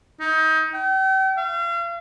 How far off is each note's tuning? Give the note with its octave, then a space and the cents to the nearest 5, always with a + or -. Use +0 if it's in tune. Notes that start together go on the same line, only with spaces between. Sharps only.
D#4 +25
G5 -40
F5 -40